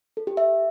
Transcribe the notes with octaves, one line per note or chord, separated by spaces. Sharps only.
A4
G4
E5